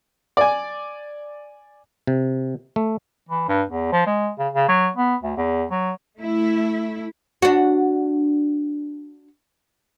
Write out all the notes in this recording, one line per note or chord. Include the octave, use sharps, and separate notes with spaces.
D5 G#5
C3
A3
E3
G2
E2
F3
G#3
C#3
C#3
F#3
B3
D2
E2
F#3
A3 E4
D4 F#4